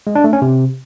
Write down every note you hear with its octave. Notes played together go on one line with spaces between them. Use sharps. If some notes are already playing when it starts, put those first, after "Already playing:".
G#3
D4
A3
C#4
C3